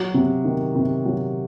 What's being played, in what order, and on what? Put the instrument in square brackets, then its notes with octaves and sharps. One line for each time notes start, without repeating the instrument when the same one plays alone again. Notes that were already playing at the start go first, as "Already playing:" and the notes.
Already playing: [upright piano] F#3
C3
D#3
C3
F#3